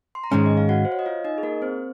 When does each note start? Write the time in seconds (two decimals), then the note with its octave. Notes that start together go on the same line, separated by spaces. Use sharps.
0.15 C6
0.24 A#5
0.31 G#2 D#3 G#3 C#4 G#4 G#5
0.46 D#5
0.57 F5
0.69 F#4 F#5
0.85 C5
0.92 C#5
0.99 D#5
1.06 F4 F5
1.24 D#4 D#5
1.38 G#4
1.43 A#3 A#4
1.62 C4 C5